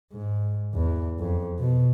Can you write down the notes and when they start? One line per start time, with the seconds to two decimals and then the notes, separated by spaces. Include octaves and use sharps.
0.13 G#2
0.74 E2
1.20 F2
1.59 B2